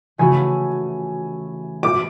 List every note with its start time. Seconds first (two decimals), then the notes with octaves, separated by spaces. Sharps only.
0.18 C#3 E3 A3 C#4 F#4 G#5
1.83 D6